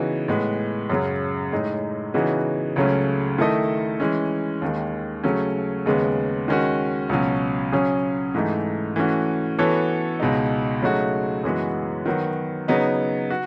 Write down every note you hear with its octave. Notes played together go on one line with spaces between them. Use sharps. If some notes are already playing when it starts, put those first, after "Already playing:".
Already playing: C#3 E3 B3 D#4 F#4
A2 G#3 B3
F#2 C#3 F#3
A2 G#3 D#4
C#3 E3 B3 D#4 F#4
C#2 C#3 F#3 A3 C#4
D#3 A3 E4 A4 D#5
E3 G#3 C#4
D#2 D#3 G#3
C#3 F#3 A3 C#4
D#2 C#3 G#3 B3
D#3 G#3 C#4 F#4
C#2 B2 F#3 C#4
C#3 F#3 C#4 G#4
G#2 E3 A3 D#4
E3 A3 C#4 F#4
E3 B3 F#4 A4 C#5
C#2 B2 G#3 D#4
C#3 F#3 A3 D#4 F#4
F#2 E3 G#3 B3 F#4
D#3 F#3 B3 F#4
C#3 F#3 B3 D#4
F#4